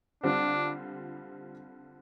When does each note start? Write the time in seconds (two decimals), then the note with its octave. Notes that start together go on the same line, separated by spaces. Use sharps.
0.23 D3 G3 C4 D4 F4